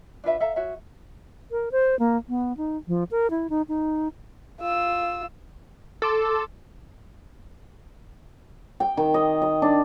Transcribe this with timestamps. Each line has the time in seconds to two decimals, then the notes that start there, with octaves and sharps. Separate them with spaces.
0.24 D4 F4 B4 E5
0.40 A4 E5 F5 A#5
0.56 F#4 C#5 E5
1.51 A#4
1.72 C5
1.99 A#3
2.29 B3
2.57 D#4
2.88 F3
3.11 A#4
3.30 E4
3.50 D#4
3.69 D#4
4.61 F4 E6
6.02 A4 C6 D6 E6
8.80 G5
8.97 D#3
9.14 D#5
9.42 D#5
9.62 D4